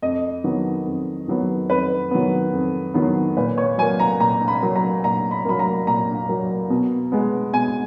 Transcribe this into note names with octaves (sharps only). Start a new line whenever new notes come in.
F2 D#5
D#3 F#3 B3
F2
D#3 F#3 B3
F2 B4
D#3 F#3 B3
F2
D#3 F#3 B3
A#2 B4
C#5
F#3 A#3 G#5
A#5
A#2 A#5
B5
F#3 A#3
A#5
A#2 A#5
B5
F#3 A#3 B5
A#5
A#2 A#5
F#3 A#3
B2
G#3 B3
B2 G#5